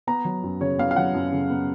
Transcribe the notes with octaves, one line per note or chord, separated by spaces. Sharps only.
B3 A#5
F#3
F#2
C#3 C#5
B3 F5
F5
F#3 F#5
F#2
C#3
B3